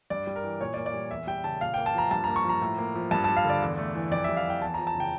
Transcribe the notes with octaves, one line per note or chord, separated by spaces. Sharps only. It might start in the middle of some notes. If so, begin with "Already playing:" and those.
G2 D5
G3
A#4
E3
A#2 C#5
D5
A#3
D5
G3
E2 E5
G3 G5
C#3 A5
A#2 F5
A#3 G5
A5
F3 A#5
G2 A5
A#3 A#5
C#6
F3 A#5
A2
A#3
F3
G2 A5
G3 A5
F5
D3 D5
E2
A3
E3
F2 D5
G3 E5
F5
E3 G5
E2 A5
F3 A#5
A5
C#3
G5